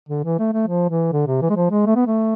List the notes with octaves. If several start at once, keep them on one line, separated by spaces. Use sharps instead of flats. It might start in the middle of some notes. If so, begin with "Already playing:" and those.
D3
E3
A3
A3
F3
E3
D3
C3
E3
G#3
F3
G#3
A3
B3
A3